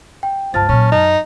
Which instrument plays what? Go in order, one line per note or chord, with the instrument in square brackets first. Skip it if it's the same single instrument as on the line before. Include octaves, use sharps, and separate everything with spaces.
[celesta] G5
[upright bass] G1 C#2 [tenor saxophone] F3 [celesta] A5 F6 A6
[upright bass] A#2 F#3 [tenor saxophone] C#4
[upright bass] F#2 [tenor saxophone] D#4